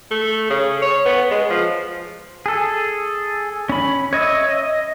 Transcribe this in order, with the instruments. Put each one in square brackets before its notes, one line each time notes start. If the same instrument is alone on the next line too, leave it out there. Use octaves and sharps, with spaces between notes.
[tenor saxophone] A3
C#3
C#5
B3
G#3
F3
[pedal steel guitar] G#4 A4
C#4 B5
C#5 D#5 E5
D#5